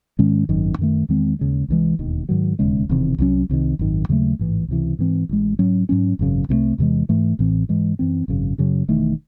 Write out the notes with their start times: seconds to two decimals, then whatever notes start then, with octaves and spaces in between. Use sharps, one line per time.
0.19 G#2 D#3 G#3 C#4
0.49 G#1 F#2 D#3
0.78 F#2 D#3 A3
1.09 E2 D#3 G#3 C4
1.39 D#2 C#3 G#3
1.68 C2 C3 E3 G#3
1.99 E1 D#2 D#3
2.29 G#2 D#3 F#3
2.59 E1 D#2 C#3 G#3
2.89 E1 E2 C3 D#3
3.18 C2 C3 F#3 C#4
3.49 C2 C3 D#3
3.79 G#1 F#2 D#3
4.09 D#2 C#3 F#3 A3
4.39 A1 G#2 E3
4.68 C#2 C3 E3
4.99 G#2 E3 C4
5.29 A1 A2 G#3
5.59 G#2 F#3 C#4
5.89 G#2 F#3 C#4
6.19 G#1 F#2 C#3
6.49 C2 C3 E3 A3
6.78 E2 C3 E3 G#3
7.09 G#2 E3 A3
7.39 A1 A2 E3 C4
7.69 G#2 E3 G#3
7.99 F#2 E3 C4
8.28 G#1 F#2 C#3
8.58 F#2 C#3 F#3
8.88 E1 E2 D#3 A3